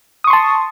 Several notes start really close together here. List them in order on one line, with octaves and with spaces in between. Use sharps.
D#6 C#6 C6 A5